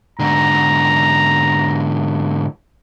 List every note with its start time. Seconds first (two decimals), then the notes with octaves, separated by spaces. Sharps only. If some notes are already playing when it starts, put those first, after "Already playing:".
0.19 G#2 D3 A#5